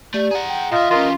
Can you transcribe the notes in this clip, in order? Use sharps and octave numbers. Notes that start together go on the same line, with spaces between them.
A3 G4 D5
G#4 F#5 A#5
G5
A#2 F4 D#5 E5
E3 C#4 F4 G4 A#4 D#5 C6